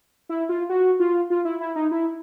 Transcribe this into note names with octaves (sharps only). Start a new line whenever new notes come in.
E4
F4
F#4
F4
F4
E4
E4
D#4
E4